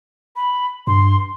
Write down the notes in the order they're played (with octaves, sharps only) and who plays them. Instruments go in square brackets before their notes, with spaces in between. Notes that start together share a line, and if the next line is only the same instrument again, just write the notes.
[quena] B5
[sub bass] G2 [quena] C6